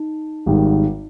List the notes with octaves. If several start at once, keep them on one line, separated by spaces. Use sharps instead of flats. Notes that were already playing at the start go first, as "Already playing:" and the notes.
Already playing: D#4
G#1 G#2 D#3 G3